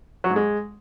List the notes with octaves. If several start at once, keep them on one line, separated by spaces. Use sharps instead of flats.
F#3
G#2
G#3